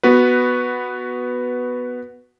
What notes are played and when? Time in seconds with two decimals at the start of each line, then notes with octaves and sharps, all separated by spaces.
0.03 B3 F#4 B4